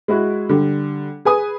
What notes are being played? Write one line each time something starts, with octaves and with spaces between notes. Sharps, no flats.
G#3 E4 F#4
D3 G3
G#4 B4 G#5 D#6